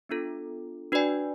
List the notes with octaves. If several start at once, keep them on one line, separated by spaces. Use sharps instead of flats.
B3 D4 F4 A4
D4 F#4 B4 D5 G#5